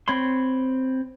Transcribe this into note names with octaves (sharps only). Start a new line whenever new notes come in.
C4 C#5 B5 C6